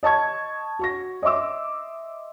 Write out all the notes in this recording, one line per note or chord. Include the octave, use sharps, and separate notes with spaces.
D#5 A5 C#6 G#6
F#4 C#6 A#6
D#5 E5 C6 D6 E6